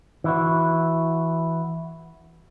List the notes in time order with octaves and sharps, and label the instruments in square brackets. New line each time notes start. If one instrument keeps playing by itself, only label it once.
[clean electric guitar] E3 E4 F#4